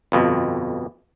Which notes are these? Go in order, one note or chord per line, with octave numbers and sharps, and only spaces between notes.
G1 F2 B2